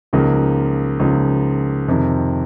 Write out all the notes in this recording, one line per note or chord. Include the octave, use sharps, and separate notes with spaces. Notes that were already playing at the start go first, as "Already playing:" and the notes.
C#2 C#3 F3 A#3 D#4
C#2 C#3 F3 A#3 D#4
F2 C3 D#3